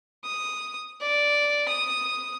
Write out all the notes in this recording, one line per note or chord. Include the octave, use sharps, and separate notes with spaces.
D#6
D5
D#6